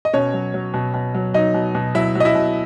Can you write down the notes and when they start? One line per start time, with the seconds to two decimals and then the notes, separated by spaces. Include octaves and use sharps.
0.05 D#5
0.13 B2 C#4 C#5
0.34 F#3
0.54 F#3
0.74 B2
0.94 B2
1.14 F#3
1.34 F#3 D#4 D#5
1.54 B2
1.75 B2
1.95 F#3 E4 E5
2.15 F#3
2.20 D#5
2.25 E4 E5
2.35 B2